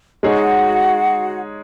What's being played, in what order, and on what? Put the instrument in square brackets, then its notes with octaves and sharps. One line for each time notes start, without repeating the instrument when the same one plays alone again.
[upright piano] G#3 D#4 G#4 C#5 [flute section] F#4 F#5